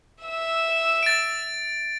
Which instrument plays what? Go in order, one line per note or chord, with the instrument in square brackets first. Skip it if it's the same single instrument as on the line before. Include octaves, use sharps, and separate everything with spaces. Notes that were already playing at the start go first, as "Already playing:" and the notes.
[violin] E5 E6
[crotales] A6 D7